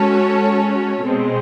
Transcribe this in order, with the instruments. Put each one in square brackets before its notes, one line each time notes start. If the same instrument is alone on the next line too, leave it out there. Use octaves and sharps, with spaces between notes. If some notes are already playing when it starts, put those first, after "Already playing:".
Already playing: [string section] G#3 C#4 F#4 A4 C#5
B2 G#3 C4